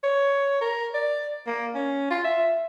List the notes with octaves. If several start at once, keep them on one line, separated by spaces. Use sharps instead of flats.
C#5
A#4
D5
A#3
C#4
F4
E5